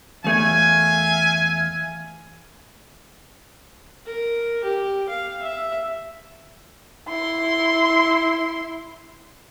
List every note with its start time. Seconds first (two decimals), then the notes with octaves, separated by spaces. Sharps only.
0.24 E2 A3 E5 F5 G#5
4.06 A#4
4.64 G4
5.09 F5
5.42 E5
7.08 E4 C6